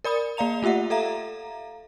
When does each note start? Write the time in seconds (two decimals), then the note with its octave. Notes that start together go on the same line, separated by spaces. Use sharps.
0.04 A#4 D5 B5 D#6
0.37 A#3 D5 F5 A#5 F7
0.63 A3 F4 G4 E5 F#5
0.90 A4 E5 F5 A#5